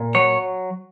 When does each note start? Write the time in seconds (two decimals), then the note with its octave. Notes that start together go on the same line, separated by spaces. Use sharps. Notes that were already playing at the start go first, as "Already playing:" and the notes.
Already playing: A#2
0.15 F#3 C#5